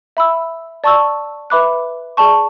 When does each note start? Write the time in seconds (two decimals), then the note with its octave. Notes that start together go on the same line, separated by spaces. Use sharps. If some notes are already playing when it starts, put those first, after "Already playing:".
0.17 E5 B5 E6
0.84 D5 A5 C#6 E6
1.50 B4 E5 B5 D6 F#6
2.17 G#4 D5 A5 C#6